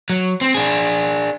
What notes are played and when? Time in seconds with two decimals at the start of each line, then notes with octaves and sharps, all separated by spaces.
0.10 F#3
0.41 C4
0.55 D4 G#4